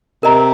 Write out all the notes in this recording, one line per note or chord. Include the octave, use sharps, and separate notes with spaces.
C3 A#4 D#5 A#5